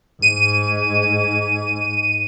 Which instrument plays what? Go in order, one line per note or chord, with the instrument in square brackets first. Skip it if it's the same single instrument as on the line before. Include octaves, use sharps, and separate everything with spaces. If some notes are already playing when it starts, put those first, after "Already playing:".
[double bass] G#2 [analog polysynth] D#7